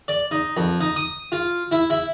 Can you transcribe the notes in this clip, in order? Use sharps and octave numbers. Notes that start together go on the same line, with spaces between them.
D5
D#4
F2
D#4
D#6
F4
E4
E4